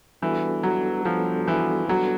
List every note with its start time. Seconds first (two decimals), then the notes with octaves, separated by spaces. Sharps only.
0.22 E3 G3 B3 D4 F#4 A4
0.63 F#3
1.05 F3 G3 B3 D4 F#4 A4
1.48 E3
1.88 F#3 G3 B3 D4 F#4 A4